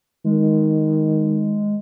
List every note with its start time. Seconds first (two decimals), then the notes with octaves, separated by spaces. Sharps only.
0.25 D#3 G#3